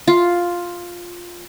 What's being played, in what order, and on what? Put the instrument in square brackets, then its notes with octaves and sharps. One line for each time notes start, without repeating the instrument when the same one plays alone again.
[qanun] F4